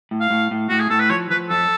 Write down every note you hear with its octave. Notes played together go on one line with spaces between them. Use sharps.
A2
F5
A2
A2
A2 F#4
G#4
A2 A4
B4
F3 C#5
F3 B4
F2 A4